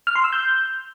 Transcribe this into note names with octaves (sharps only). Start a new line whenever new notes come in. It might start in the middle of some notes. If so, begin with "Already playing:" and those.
F6
C6
E6
G6